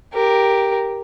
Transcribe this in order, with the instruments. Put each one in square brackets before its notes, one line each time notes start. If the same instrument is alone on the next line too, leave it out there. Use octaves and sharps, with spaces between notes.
[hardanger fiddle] G4 A#4